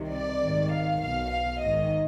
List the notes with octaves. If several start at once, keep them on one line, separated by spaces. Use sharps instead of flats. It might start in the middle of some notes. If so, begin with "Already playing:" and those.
Already playing: C2 C3 D#3
D5
G#1 G#2 D#3
F5
B1 B2 F5
F5
G#1 G#2 D#3 D#5